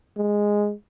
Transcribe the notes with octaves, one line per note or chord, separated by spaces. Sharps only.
G#3